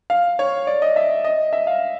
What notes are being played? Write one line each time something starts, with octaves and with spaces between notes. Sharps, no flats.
F5
C#5
D5
D#5
E5
D#5
E5
F5